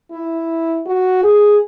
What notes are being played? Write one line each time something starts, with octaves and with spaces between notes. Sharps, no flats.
E4
F#4
G#4